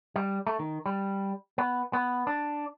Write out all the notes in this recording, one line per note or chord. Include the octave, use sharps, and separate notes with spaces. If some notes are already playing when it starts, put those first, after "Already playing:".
G3
A3
D#3
G3
B3
B3
D4